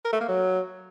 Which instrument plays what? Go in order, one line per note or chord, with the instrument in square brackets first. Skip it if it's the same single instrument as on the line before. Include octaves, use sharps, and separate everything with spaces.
[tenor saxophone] A#4
A3
A#3
F#3